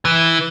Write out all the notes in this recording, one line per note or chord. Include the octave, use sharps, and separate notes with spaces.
E3